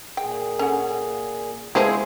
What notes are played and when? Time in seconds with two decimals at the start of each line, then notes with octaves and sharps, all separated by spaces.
0.17 A#2 G#4 G5
0.59 C#4 A4 F#5
1.75 F3 G#3 B3 E4 G4 G#4 C5